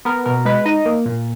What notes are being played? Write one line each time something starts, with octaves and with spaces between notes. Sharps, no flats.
B3 A#4
B2 A#4
G#3 B4
D#4 D#5
A#3
A#2